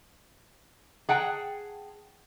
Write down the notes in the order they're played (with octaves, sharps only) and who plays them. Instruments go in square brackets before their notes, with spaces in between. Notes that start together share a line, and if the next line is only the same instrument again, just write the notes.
[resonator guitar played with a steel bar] G#4 F#5 G5 A5